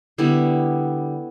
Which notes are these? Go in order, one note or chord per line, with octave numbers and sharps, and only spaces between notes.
D3 G3 B3 E4